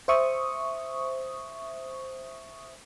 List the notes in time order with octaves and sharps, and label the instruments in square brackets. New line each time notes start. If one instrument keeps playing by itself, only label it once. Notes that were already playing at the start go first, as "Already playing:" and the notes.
[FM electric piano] C5 E5 C#6 D#6